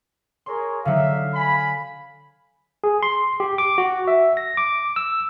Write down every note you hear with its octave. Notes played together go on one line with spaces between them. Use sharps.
G#4 A#4 C#5 C6
D3 F#3 D#4 E5 F5
G#5 B5
G#4
C6
G4
D6
F#4
E5
A#6
D6
E6